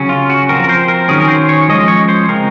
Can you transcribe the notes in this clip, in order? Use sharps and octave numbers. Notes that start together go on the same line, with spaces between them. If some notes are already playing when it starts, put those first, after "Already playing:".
Already playing: C#3 F#3 C#4
F4
F#4
F3 C4 A#4
A#4
C5
A#4
D#3 F#3 C#4 G#4
A#4
C5
C#5
F3 G#3 C#4 D#5
C#5
C5
C#3 F3 G#3 C4 A#4